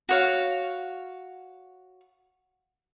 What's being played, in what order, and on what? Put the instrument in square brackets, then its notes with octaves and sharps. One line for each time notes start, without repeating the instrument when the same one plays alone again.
[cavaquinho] F#4 C#5 F5